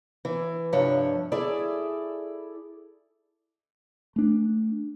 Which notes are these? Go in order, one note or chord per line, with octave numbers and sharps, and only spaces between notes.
E3
G2 C3 F3 D4 C#5
E4 G#4 A4 D5
A3 D4